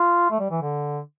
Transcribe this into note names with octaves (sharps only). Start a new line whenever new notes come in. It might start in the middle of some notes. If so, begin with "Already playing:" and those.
Already playing: F4
A3
G3
E3
D3